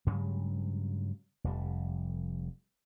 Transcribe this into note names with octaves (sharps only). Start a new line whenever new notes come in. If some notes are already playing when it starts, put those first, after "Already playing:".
G2 C#3 F#3 G#3
F1 F2 G3